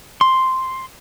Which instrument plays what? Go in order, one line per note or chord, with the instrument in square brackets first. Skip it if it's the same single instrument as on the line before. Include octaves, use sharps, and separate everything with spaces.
[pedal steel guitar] C6